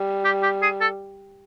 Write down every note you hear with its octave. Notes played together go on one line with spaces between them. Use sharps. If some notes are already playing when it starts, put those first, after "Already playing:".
Already playing: G3
G4
G4
G#4
A4